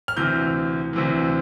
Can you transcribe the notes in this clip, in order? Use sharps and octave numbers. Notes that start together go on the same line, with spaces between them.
F6
D2 C3 E3 G6
D2 C3 E3